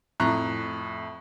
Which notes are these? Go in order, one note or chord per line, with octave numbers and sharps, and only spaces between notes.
F2 A2 A#5 C#6 F#6